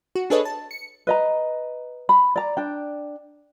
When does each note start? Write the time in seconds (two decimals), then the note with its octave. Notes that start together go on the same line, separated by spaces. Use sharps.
0.15 F#4
0.30 D4 G#4 A4 B4 C#5 D#5
0.45 A5
0.71 C#7
1.07 B4 D#5 A#5
2.09 B5
2.36 D5 A#5
2.57 D4 G5